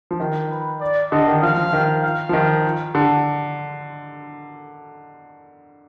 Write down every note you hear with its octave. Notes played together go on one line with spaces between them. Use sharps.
F3
D#3
B4
D5
D3 D#5
D#3
F3 F5
F3
D#3
F5
F3
D#3
D3